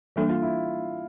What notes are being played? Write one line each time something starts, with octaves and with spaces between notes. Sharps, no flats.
E3 G3 A#3 D4 A4
F4
E4